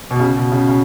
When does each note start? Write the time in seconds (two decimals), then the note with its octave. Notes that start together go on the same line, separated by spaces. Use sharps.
0.11 B2
0.20 C#3
0.36 B2
0.52 C#3
0.68 C#3